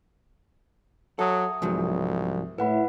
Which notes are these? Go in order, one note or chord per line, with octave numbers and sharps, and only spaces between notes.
F#3 A4 E5 D#6
C2 G#2 F3 F#3
A2 E4 B4 F#5 B5